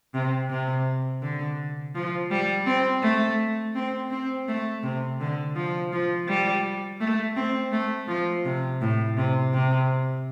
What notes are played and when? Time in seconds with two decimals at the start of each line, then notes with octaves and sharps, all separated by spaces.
0.14 C3
0.50 C3
1.22 D3
1.95 F3
2.31 G3
2.66 C4
3.03 A3
3.75 C4
4.11 C4
4.48 A3
4.83 C3
5.20 D3
5.55 F3
5.92 F3
6.28 G3
7.00 A3
7.36 C4
7.72 A3
8.08 F3
8.45 C3
8.81 A2
9.17 C3
9.53 C3